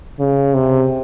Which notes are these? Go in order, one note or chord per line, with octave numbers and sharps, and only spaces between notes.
C#3
C3